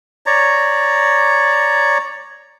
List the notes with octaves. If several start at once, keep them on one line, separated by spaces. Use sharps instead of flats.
C#5 D5 A#5